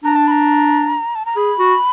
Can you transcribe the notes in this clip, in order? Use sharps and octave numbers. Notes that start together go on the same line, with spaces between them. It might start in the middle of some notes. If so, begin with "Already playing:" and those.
D4 A#5
A5
B5
A#5
A5
A#5
G#4 B5
F#4